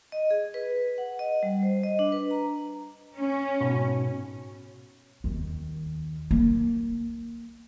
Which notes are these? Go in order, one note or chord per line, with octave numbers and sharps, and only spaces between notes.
D#5
G#4
B4
F#5
D#5
G3
C5
D#5
D4
B4
A#5
C#4
G#2 B2
D#2
A#3